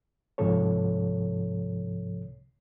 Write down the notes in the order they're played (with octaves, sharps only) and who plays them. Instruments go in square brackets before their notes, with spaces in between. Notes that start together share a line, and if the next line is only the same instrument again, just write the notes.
[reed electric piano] C2 G#2 C3 F3 A4 C#5